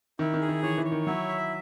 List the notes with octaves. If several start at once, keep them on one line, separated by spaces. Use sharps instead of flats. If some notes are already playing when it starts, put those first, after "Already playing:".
D#3 E4
D#3
G#4
D#3
E3 C#5
E3
C#5
D#3
F#3 E4
E5